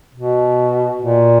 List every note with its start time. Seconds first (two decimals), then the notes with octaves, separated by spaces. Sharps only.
0.15 B2
1.02 A#2